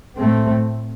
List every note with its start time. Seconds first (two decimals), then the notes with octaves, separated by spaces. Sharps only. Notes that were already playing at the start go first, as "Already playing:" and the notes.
0.17 A2 A3 C4